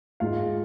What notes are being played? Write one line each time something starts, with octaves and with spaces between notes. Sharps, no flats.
G#2 F4 F5